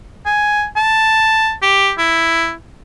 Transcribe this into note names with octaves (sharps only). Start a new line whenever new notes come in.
G#5
A5
G4
E4